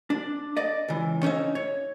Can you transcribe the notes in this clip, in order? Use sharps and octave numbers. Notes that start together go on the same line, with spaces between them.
D4
D5 D#5
C#2 E3
C#4 D#4 C#5 E5
C#5